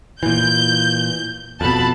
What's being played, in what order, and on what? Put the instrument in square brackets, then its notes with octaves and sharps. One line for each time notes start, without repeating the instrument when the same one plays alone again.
[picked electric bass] A#2 E3 [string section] G6
[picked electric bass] F2 B2 [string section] A5 B5